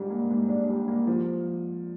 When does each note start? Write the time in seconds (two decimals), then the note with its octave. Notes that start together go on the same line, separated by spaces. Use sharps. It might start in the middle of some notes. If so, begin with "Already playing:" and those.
Already playing: G#2 G3 D4
0.10 A#3
0.30 G#2
0.49 D4
0.69 G3
0.88 A#3
1.07 F3